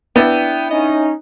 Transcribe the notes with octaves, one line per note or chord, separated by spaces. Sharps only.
B3 D4 E4 G5
C#4 D#4 D#5